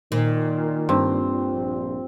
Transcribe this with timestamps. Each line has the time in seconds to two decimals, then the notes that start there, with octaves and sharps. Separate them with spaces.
0.12 A#2 D#3
0.89 G2 C4
1.53 A#1